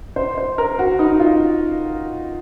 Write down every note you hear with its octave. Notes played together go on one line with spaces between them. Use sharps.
C5
C5
A#4
F#4
D#4
F4